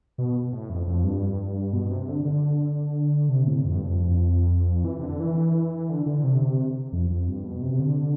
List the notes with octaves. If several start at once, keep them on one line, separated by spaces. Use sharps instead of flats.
B2
A2
F2
F2
G2
B2
C3
D3
D3
C3
A2
F2
G2
F2
E3
C3
D3
E3
D3
D3
C3
C3
F2
F2
G2
B2
C3
C3
D3